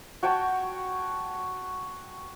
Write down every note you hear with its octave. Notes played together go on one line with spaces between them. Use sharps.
F#4 C#5 G5 A5